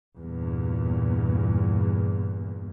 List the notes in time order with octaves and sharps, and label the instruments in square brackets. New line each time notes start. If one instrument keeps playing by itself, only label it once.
[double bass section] E2 G2 A#2